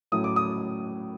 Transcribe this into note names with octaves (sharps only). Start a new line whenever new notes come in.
A2 F#3 A3 C#4 E4 D#6
D6
D#6